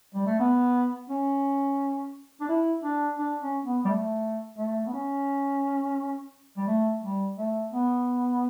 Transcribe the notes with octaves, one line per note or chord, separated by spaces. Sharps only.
G3
A3
B3
C#4
D4
E4
D4
D4
C#4
B3
G3
A3
A3
B3
C#4
G3
A3
G3
A3
B3